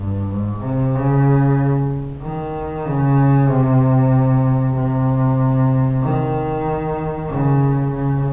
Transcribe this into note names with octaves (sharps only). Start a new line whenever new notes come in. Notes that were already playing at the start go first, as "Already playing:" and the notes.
Already playing: G2
G#2
C3
C#3
D#3
C#3
C3
C3
D#3
C#3
C#3